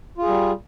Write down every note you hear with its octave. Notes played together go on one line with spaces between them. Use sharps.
G3 F4 G#4